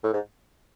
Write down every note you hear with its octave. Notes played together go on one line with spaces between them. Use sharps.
A2
G#2